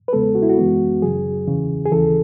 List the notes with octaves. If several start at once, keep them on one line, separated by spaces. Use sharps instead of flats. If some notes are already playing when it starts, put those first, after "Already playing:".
B4
E2 C#3 G#3 B3 A4
F#4
E4
F#4
F#2 E3 G#3 B3
F#2 C#3 F#3 G#4
E2 C#3 E3
G#4
D#2 C#3 E3 A4